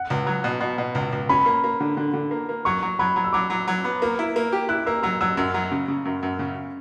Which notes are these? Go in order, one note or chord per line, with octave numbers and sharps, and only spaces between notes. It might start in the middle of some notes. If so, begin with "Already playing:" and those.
Already playing: F#5
C#2
F#3
B2
B2
B2
C#2
C#2
C#4 B5
A#3
A#3
D3
D3
D3
A#3
A#3
F#3 C#6
F#3
F#3 B5
F#3
E6
F#3 D6
F#3
F#3
B3
A#3
E4
A#3
G4
E4 F#6
A#3 E6
F#3 E6
F#3 E6
F#2 E6
F#3
C#3
C#3
F#2
F#2
C#3